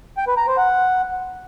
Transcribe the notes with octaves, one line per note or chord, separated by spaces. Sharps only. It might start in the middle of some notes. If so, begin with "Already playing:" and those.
G5
B4
A#5
C5
F#5